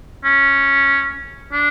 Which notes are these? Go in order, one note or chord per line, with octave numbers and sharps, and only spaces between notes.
C#4
D4